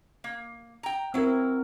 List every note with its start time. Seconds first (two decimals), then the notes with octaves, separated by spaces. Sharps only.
0.24 A#3
0.83 G5 A#5
1.14 F#3 C4 E4 A#4